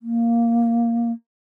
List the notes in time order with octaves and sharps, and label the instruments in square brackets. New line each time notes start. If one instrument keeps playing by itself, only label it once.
[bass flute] A#3